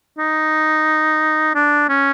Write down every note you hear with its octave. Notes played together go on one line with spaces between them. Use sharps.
D#4
D4
C#4